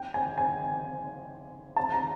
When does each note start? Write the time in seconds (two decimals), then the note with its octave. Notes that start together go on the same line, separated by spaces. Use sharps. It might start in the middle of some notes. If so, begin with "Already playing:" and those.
Already playing: G5
0.14 G#5
0.38 G#5
1.76 A5
1.92 A#5